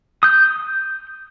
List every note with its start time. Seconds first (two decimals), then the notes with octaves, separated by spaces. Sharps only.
0.23 D#6 G6